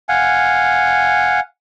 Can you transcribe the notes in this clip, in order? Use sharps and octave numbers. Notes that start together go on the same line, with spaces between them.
F5 F#5 G#5